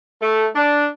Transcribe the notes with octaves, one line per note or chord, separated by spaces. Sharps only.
A3
D4